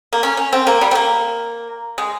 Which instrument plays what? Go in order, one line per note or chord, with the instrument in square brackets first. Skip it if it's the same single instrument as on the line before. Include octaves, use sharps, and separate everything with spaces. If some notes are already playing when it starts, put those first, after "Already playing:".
[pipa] A#3
C#4
C#4
C4
A#3
G3
C4
A#3
G#3